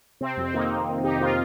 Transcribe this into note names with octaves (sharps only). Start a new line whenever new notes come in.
C3 C4
F2
C4
D#3 A#3 D#4
F2
C3
F2 D#4 G4
D#3 F4 A#4